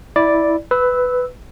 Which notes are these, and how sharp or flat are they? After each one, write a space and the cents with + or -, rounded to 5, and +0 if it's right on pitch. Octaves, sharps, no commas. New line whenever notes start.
E4 -10 D5 +0
B4 +10 E6 -15